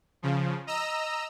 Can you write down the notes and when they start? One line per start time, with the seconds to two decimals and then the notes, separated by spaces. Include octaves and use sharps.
0.22 C#3 F3
0.67 D#5 A#5 E6